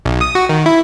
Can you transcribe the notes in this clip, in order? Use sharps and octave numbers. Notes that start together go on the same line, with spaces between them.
B1
D#6
F#4
D#3
E4